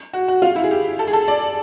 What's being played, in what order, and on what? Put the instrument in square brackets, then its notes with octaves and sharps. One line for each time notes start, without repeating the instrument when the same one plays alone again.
[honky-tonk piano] F#4
F#4
F4
E4
G#4
G4
A4
G#4
A4
D5